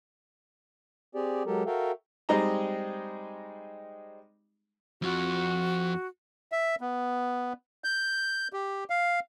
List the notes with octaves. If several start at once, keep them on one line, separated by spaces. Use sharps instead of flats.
C4 G4 G#4 D5
F#3 G#3 G4 A4 A#4
F#4 A4 A#4 E5 F5 G5
G3 G#3 C4 D#4 G#4 A#5
F2 F3 F#4
E5
B3
G6
G4
F5